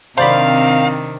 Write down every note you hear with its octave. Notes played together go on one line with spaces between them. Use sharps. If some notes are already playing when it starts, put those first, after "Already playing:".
C3 D#3 C4 D4 C5 D5 F5 B5